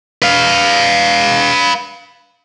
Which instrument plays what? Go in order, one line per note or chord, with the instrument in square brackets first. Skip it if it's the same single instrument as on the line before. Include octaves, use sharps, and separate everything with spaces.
[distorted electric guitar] B4 F5